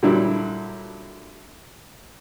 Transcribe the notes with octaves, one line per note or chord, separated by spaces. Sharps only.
A#2 D3 F#3 G3 D4 E4